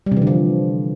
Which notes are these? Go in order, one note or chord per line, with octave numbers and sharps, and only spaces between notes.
G3
C3
E3
D3
F3